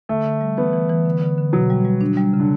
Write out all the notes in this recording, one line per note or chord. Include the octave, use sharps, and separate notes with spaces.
D3 A3
D3
G3
E3 B3
E3
E3
D3
D3
D3
B2 F#3
G3
G3
D4
G3
C#3
D3